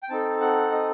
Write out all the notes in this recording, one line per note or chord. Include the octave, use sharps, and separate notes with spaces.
G5
C4 D#4 A4 A5
F#5
D#5